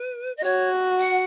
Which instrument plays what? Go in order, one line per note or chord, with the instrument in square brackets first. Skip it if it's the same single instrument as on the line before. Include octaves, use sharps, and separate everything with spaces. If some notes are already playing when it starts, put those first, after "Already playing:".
Already playing: [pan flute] B4
D#5
[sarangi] F#4 [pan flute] C#5
[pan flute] F#5